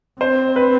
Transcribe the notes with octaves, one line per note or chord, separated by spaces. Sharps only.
C4 C5
B4